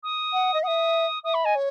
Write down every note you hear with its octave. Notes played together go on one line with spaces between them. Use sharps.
D#6
F#5
D#5
E5 F#5 D#6
E5 D#6
B5
D#5 G#5
C#5